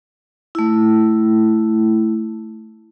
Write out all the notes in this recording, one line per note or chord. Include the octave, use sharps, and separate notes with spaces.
A3 E4